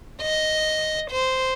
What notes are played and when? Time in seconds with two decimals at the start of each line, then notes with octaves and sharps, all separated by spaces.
0.21 D#5
1.11 C5